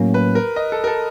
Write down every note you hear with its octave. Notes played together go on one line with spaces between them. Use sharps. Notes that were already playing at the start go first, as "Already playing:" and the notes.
Already playing: A2 F#3 A#3 C#4
B4
A#4
D#5
A4
A#4
A4